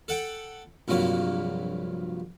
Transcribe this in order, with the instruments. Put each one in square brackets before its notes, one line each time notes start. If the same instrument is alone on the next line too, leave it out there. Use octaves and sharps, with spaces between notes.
[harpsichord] A4 F#5 G5
A#1 G2 C3 F#3 A#3